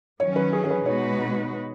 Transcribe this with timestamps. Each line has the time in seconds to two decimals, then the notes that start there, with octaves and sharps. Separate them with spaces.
0.20 D#3 F#3 C#4 C#5
0.36 B4
0.53 G#4
0.64 G#4
0.70 B4
0.86 B2 G#3 D#4 F#4 B4 C#5